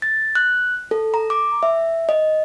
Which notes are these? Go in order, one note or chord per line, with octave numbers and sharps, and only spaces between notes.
A6
F#6
A4
A#5
D6
E5
D#5